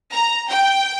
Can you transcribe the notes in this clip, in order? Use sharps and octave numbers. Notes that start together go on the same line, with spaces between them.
A#5
G5